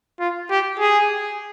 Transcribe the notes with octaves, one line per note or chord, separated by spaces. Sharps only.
F4
G4
G#4